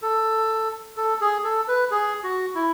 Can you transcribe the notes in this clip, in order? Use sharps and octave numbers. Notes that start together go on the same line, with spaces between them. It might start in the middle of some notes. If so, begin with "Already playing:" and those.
A4
A4
G#4
A4
B4
G#4
F#4
E4